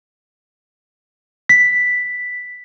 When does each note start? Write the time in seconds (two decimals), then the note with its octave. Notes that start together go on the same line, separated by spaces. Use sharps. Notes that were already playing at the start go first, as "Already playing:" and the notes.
1.49 B6